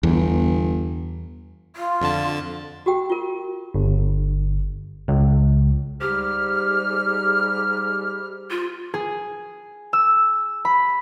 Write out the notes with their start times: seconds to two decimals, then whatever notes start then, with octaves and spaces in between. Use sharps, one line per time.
0.03 G1 E2
1.75 F4
2.01 F2 D3 A5
2.86 F#4 G4 G5
3.10 F4 A#4
3.74 G1
5.08 C#2
6.01 G#2 G3 G4 F6
8.50 F4
8.94 G#4
9.93 E6
10.65 B5